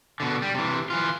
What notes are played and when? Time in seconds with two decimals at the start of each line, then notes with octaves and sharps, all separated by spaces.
0.20 B2 D3
0.42 G3
0.54 C3 E3
0.90 E3 F4